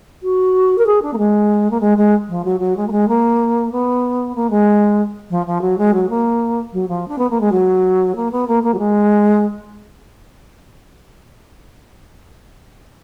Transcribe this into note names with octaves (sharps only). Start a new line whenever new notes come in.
F#4
A#4
G#4
D4
A#3
G#3
A#3
G#3
G#3
F3
F#3
F#3
G#3
A#3
G#3
A#3
B3
A#3
G#3
F3
F3
F#3
G#3
F#3
A#3
F#3
F3
D4
B3
A#3
G#3
F#3
A#3
B3
A#3
A#3
F#3
G#3